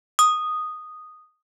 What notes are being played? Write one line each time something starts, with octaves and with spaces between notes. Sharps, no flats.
D#6